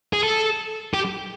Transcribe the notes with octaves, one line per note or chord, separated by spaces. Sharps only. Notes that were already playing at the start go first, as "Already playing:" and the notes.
G#4
A4
G4